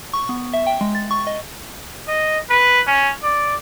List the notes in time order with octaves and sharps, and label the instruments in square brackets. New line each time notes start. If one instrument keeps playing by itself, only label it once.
[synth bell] C#6
B3
E5
G5
G#3
A6
C#6
D#5
[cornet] D#5
B4
C#4
D5